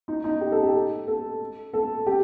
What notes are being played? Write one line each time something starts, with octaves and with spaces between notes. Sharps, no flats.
D#4
D#4
G4
A4
G4
A4
A4
G4